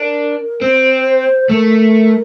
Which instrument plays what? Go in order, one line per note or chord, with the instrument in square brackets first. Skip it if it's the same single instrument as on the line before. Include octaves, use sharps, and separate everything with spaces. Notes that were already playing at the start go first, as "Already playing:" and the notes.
Already playing: [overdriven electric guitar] D4 [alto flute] A#4
[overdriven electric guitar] C4 [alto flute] C5
[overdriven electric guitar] A3 [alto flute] A#4